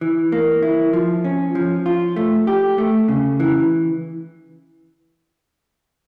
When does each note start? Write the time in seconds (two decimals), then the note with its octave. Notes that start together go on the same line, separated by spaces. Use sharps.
0.01 E3
0.32 A#3
0.63 E4
0.93 F3
1.24 C#4
1.55 F3
1.86 F4
2.16 A3
2.47 G4
2.78 A3
3.09 C#3
3.40 E3